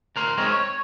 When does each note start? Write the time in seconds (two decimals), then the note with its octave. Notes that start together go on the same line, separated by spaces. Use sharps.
0.16 D2 A#4 C6
0.38 G#3 C4 C#4 D#4 A#4
0.51 C#5